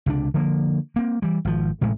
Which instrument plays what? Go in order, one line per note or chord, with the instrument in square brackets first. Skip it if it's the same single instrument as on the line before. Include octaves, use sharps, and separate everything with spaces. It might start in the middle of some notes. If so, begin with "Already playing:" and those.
[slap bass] C#2 C3 D4
D3 F3 G#3 A#3
A#3 C4
E3 G3
G#1 F3
A1 A2 C3 G#3